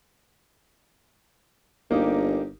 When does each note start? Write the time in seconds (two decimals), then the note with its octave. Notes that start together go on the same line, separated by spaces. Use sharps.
1.91 G1 A#3 D#4 G4